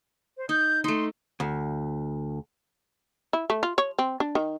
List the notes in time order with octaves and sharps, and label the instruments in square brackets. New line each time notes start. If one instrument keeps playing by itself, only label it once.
[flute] C5
[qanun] D#4 [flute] G6
[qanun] A3 D#4 [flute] C6
[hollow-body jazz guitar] D2
[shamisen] E4
A3
F4
C#5
C4
D4
D#3